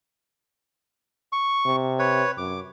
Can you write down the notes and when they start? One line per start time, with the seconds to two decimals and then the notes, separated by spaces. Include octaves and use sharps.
1.33 C#6
1.65 C3
1.99 B4 C#5
2.37 F#2 D6